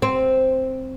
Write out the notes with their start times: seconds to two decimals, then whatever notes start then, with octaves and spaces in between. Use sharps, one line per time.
0.02 C4